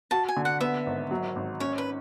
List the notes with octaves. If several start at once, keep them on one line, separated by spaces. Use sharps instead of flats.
F#4 A5
G#5
D3
F#5
B3 E5
G#1
F#3
G#1
C#4 C#5
B4